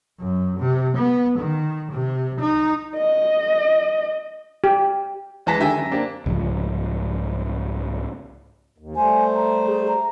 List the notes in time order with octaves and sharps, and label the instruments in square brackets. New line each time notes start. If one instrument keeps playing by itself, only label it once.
[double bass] F#2
C3
B3
D#3
C3
D#4
[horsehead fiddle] D#5
[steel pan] G4
[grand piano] C#2 E3 G#3 A5 A#6 B6
D3 D#3 G4 E5 G#5
F#2
A#3 C4 D4 G4
[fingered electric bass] C2 G#2 C#3 F3
[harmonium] D#2
[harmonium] G3 A3 C5 [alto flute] G#5
[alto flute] A#5
G#4
A#5